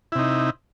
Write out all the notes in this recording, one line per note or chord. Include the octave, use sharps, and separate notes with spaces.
C3 D#4 E4